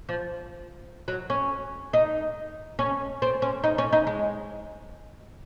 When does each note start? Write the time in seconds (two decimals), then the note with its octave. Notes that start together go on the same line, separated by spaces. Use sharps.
0.09 F3
1.08 F#3
1.30 C#4
1.93 D#4
2.79 C#4
3.22 C4
3.42 C#4
3.64 D#4
3.78 C#4
3.93 D#4
4.07 G#3